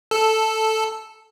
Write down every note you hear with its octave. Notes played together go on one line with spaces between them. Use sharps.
A4